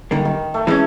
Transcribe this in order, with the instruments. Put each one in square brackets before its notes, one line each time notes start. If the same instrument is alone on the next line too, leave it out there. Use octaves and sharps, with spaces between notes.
[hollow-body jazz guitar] F#2 D3 G3 A#3 [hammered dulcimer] D#3
[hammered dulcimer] D#3
A3
[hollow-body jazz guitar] E3 G#3 C#4